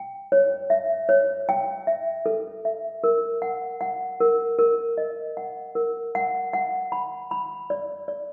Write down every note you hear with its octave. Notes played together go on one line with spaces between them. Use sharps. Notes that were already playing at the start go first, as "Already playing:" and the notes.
Already playing: G5
C#5
E5
C#5
G5
E5
A4
E5
A#4
F#5
F#5
A#4
A#4
D#5
F#5
A#4
F#5
F#5
B5
B5
D5
D5